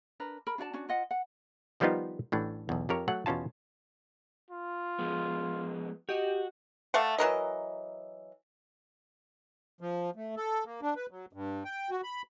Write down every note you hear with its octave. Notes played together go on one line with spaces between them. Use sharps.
D4 A#4 B4
A#4 B5
D4 F#4 D5 A5
C#4 D4 F#4 D5
F4 D#5 F#5
F#5
D#3 F3 G3 B3 D#4 F4
A1 A2 D4
B1 E2
F2 G4 A#4 C#5
F#3 A3 F#5
E2 B2 C#4 F4 A5
F4
F3 G#3 B3
F#4 G4 D#5
A3 D5 F5 F#5
E3 F#3 A#4 D#5
F3
A3
A4
A#3
D4
B4
F#3
G2
G5
F#4
B5